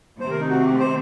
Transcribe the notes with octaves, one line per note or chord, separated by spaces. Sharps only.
C3 D#3 A3 C4 C5
A#4
D#4
F#4
G4
C5